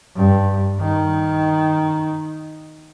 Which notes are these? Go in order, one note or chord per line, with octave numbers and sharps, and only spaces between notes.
G2
D#3